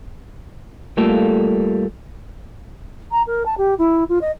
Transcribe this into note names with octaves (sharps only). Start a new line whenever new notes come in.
G3 A3 A#3 F4 A4
A#5
A#4
A5
G4
E4
F4
D#5